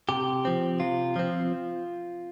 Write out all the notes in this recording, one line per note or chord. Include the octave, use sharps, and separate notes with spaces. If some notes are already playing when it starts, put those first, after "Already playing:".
C3 G4
F3 C4
C3 F4
F3 C4